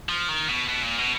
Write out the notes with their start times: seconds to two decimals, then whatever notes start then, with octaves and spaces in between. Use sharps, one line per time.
0.09 F3
0.28 D#3
0.48 B2
0.68 B2
0.82 A#2
0.98 B2